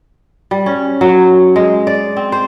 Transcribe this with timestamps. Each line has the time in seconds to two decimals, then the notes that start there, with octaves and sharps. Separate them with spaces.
0.51 G3
0.66 C#4
1.01 F#3
1.56 G#3
1.87 D5
2.16 C4
2.32 C5